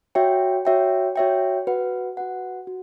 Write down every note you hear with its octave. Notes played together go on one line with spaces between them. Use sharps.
F#4 C#5 E5 G5
F#4 C#5 E5 G5
F#4 C#5 E5 G5
F#4 B4 F#5
F#4 B4 F#5
F#4